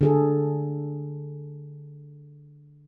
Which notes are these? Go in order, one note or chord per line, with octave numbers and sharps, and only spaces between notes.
D3 G#4 A4